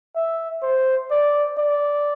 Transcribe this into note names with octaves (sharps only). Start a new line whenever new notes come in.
E5
C5
D5
D5